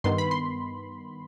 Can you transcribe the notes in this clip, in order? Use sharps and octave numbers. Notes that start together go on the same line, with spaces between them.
G2 D#3 B3 C6
B5
C6